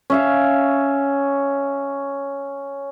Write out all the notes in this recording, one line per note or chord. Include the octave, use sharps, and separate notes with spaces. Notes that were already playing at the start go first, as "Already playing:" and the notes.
C#4 E5 F5